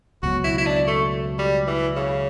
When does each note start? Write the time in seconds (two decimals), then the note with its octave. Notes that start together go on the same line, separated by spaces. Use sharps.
0.23 C#2 B2 F#3 F#4
0.44 E4
0.58 E4
0.66 D4
0.87 A3
1.39 G3
1.67 E3
1.96 C#3